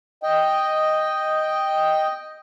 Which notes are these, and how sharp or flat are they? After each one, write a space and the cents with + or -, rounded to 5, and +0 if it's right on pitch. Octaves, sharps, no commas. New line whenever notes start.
D#5 +0 G5 +0